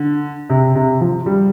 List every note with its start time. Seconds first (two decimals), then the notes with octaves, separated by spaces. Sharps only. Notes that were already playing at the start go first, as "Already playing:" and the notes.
Already playing: D3
0.50 C3
0.75 C3
1.01 F3
1.26 G3